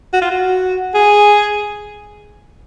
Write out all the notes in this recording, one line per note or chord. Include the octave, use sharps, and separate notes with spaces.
F#4
F4
F#4
G#4